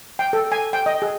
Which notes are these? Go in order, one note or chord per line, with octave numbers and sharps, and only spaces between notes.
G5
A4
G#5
G5
D#5
G#4